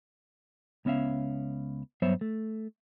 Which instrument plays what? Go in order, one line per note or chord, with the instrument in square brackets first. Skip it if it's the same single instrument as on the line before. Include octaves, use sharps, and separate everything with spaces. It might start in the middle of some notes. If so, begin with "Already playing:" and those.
[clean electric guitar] C#2 B3 C#4 E5 F5
G2 F#3 B3 C5 C#5 E5
A3